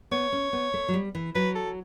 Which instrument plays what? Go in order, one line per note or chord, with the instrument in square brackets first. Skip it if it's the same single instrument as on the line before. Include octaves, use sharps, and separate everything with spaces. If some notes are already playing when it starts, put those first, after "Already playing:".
[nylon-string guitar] B3 [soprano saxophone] C#5
[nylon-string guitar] C#4
B3
A3
F#3
G3
E3
[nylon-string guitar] F#3 [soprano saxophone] B4
[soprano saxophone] A4